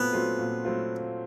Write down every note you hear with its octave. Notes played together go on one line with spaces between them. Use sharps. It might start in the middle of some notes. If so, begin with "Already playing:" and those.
Already playing: A#2 F#3 A3 B3 C4 F4
F#3 A3 C4 F4
A#2
F#3 A3 C4 F4